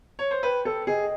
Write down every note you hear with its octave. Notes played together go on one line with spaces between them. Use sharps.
C#5
C5
B4 G5
A4
G#4 D#5